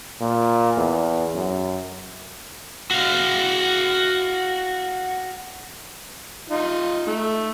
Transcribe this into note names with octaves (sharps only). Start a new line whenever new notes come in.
A#2
E2
F#2
F#4 F5
D#4 F4
A3